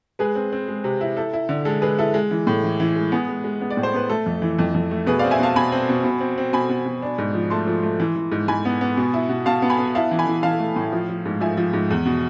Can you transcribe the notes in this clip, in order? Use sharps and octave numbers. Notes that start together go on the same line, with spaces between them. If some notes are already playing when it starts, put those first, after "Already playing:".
G#3 G#4 B4
C4
C4
G#3
C3
E4
E4 A4
E4
D3
G#3 A4
G#3 G#4 B4
E4 A4
G#3
E3
A2
E3
E3
G#3
B3 G#4
G#3
G#3
B3
D5
A2
C5
B3 B4
A3 A4
F2
E3
F2
F2
A3
B2 G#4 B4
C4 D5 F5
E5 G#5
B2 F5 A5
B2 G#5 B5
C4
B2
B2
C4
C4
B2 G#5 B5
B2
B2
D4
G#2
F3
A3 A5 C6
F3
A3
E3
E3
G#2
G#2 G#5 B5
B3
B3
B2
E4
B2
B2 F5 A5
B3
G#5 B5
B3
E4 F5 A5
E3
G#5 B5
E3
E3 F5 A5
A3
A2
F3
F3
G#2
F3 E5 G#5
F3
G#2
E2
B2